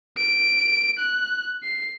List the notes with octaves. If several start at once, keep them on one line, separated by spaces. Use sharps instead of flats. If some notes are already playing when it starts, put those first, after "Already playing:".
D7
F#6
C7